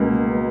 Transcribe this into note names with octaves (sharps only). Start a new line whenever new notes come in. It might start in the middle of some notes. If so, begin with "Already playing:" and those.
Already playing: C#2 B2 G#3 A#3